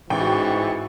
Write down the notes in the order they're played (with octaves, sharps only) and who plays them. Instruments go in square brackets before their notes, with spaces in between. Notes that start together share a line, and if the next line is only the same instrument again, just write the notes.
[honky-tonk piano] A1 G5 [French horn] G#2 [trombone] E3 [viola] F#4 C#6